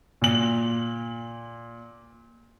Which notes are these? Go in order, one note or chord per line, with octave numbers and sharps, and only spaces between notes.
A#2 F#7